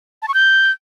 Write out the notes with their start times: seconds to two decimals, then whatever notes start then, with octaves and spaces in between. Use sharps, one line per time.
0.22 A5
0.28 C#6
0.34 G6